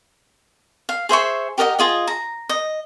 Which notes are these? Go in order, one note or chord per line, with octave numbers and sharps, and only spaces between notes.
F5
G#4 C5 E5 C#6
G4 A#4 D#5 F#5
F4 G#4 D#5
A#5
D#5